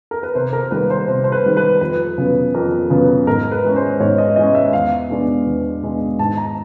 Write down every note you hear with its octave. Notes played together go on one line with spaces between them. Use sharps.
A#4
B4
C3 C5
A#4
D#3 G3 A#3 B4
C5
C3 C5
C5
B4
D#3 G3 A#3
B4
F2 B4
C#3 F#3 B3
F2 A#4
C#3 F#3 B3
G#2 A#4
B4
E3 G#3 C#4
C5
G#2 C#5
D#5
E3 G#3 C#4 D#5
E5
E2 F5
B2 G#3 B3 D4
E2
B2 G#3 B3 D4
G#2 A5
A#5